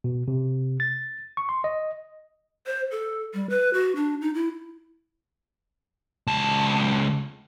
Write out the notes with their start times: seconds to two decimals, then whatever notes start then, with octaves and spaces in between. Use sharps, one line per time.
0.04 B2
0.28 C3
0.80 A6
1.37 C#6
1.49 C6
1.64 D#5
2.67 C5
2.91 A4
3.34 G3
3.50 B4
3.74 F#4
3.96 D4
4.21 D#4
4.34 E4
6.27 C#2 A5